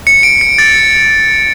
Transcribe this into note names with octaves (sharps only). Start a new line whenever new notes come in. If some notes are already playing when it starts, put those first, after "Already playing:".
C#7
D7
C#7
A6